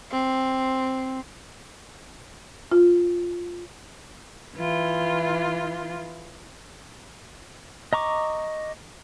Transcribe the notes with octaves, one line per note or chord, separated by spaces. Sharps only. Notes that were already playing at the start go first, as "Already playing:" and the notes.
C4
F4
E3 F4
D#5 A#5 C#6 D6